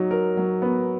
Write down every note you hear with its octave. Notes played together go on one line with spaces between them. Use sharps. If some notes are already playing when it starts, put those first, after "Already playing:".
Already playing: F#3 D#4
A#4
F#3
B3